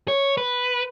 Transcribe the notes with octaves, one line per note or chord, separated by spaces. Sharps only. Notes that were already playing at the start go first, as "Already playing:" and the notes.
C#5
B4